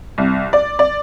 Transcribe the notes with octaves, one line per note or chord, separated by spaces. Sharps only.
C2
D5
D5